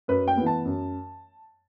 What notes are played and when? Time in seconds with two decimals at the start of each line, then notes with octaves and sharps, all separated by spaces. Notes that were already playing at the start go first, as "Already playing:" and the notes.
0.08 F#2 B4
0.28 G5
0.37 E3 B3
0.46 A5
0.65 F#2